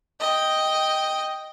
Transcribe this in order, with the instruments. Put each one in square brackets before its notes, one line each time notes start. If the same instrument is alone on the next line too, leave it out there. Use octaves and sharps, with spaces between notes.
[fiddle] D#5 G5